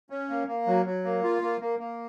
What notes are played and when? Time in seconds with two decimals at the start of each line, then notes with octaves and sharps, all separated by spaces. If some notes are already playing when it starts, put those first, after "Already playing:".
0.10 C#4
0.29 A#3
0.47 A#3
0.67 F#3
0.85 F#3
1.04 A#3
1.23 F4
1.42 A#3
1.61 A#3
1.79 A#3